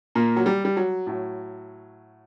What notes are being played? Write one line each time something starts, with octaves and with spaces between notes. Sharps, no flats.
A#2 A#3
F#3
G3
G3
F#3
A2 F#3